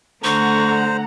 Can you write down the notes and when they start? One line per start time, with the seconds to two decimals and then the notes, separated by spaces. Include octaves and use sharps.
0.24 D3 A3 C5 F#5 A#5 C#6